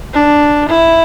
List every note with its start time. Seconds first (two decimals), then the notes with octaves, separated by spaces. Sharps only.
0.14 D4
0.69 E4